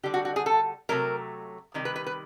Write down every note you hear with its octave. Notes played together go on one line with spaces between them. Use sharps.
D3 G3 G4
F#4
F#4
G#4
A4
C3 D#3 F#3 A3 A#4
C3 D#3 G3
B4
B4
B4